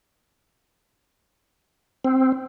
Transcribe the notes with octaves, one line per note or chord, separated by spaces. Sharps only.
C4